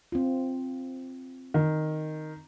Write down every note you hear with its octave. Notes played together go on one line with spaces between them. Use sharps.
C4 F4
D#3